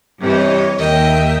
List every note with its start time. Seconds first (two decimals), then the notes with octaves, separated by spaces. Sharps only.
0.19 G2 C3 E3 G4 C#5 D#5
0.76 D#2 A#4 D#5 E5 G5